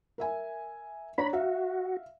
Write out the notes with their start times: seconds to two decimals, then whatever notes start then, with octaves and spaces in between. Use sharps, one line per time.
0.18 A#4 E5 G#5
1.18 D4 C#5 A#5 B5
1.33 F#4 E5 F5